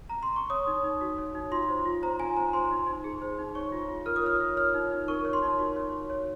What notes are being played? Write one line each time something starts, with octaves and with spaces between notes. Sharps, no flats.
A#5
C6
C#6
C#5 D#6
D#4
D#4
F#4
C#5
D#4
F4 C6
C5
F4
C5 A#5
F4 G#5
C5 A#5
C5 C6
D#4
D#4
G#4
C5
D#4
C#5 C#6
F4
F4
A#4 F6
D#6
C#5 F6
F4
C#5 F6
D#4
D#4
A#4 C#6
C#5
C6
D#4
F#4
C#5
F#4
C#5